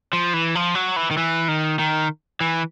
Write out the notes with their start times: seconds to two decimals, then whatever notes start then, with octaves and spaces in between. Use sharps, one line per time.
0.13 F3
0.34 E3
0.55 F3
0.75 F#3
0.96 E3
1.11 D#3
1.17 E3
1.48 D#3
1.79 D#3
2.41 E3